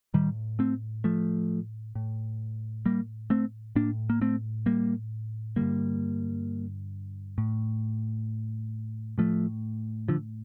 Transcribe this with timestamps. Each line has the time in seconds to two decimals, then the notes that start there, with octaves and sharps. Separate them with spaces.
0.14 A2 D#3 G3
0.59 A3 C4
1.04 F3 A3
1.95 A2
2.86 G3 A#3
3.30 A3 C4
3.75 A2 A#3 D4
4.10 A#3
4.21 A3 C4
4.66 G3 A#3
5.56 G2 D3 G3 A#3
7.38 A2
9.18 A2 F3 A3
10.08 D3 F3